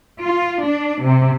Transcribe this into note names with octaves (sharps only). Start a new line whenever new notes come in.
F4
D4
C3